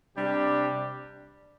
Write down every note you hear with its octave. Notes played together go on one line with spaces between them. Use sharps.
C3 G3 D4 G4